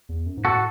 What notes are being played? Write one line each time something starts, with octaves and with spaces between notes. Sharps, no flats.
E2
F#2
G#2
A2 F#4 A4